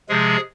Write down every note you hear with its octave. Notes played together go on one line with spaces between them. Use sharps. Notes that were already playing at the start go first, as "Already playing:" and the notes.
C3 F3 G#3 G#4